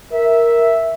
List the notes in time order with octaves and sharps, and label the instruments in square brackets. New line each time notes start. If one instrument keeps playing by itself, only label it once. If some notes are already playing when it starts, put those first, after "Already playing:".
[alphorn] A#4 [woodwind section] E5